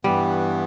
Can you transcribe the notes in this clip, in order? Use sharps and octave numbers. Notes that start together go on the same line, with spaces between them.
G2 E3 G3 B3